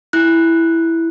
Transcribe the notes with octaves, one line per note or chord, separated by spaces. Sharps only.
E4 F#6